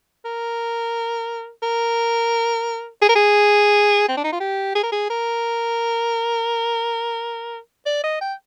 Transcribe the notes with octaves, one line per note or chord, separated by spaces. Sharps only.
A#4
A#4
G#4
A#4
G#4
C4
D4
D#4
F4
G4
G#4
A#4
G#4
A#4
D5
D#5
G5